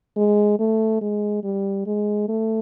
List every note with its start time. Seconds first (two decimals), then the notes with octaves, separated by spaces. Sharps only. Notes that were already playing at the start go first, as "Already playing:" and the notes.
0.17 G#3
0.59 A3
1.01 G#3
1.44 G3
1.86 G#3
2.29 A3